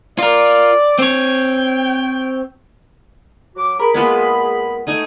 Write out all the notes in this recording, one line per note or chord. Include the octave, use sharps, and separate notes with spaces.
F4 A#4 D5
C4 C#5 G5
F#3 F#4 D6
G#4 A#4 B5
G#3 A#3 B3 F4
A3 D#4 G#5